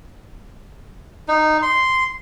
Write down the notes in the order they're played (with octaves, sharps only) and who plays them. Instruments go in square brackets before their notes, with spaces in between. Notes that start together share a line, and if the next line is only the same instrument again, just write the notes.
[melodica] D#4
C6